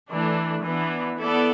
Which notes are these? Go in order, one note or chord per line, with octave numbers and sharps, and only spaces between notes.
E3 A3 D4
E3 B3 D4
B3 E4 A4 D5